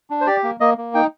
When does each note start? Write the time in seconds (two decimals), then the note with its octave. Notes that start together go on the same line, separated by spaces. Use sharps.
0.10 D4
0.21 C5
0.26 G4 D5
0.44 A#3
0.60 A#3 D#5
0.78 A#3
0.94 D#4 G5